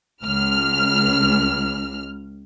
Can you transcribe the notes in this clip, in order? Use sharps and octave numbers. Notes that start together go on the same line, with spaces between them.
C#2 F6